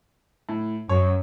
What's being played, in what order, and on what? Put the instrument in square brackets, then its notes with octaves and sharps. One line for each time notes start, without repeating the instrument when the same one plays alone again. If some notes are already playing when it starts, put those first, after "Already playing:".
[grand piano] A2
[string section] F#2 [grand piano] C#5